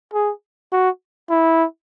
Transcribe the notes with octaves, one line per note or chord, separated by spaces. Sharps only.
G#4
F#4
E4